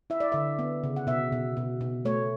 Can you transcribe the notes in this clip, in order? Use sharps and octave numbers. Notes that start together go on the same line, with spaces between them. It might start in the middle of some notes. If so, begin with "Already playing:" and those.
E4 E5
D5
D3 E5
B3
C#3
F#5
B2 E5
B2
B2
B2
A3 C#5